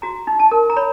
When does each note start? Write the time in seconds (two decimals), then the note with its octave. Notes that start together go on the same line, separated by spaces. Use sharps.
0.02 F#4 A#5
0.27 D#4
0.39 A5
0.51 A#4
0.70 A#5
0.76 C#5 B5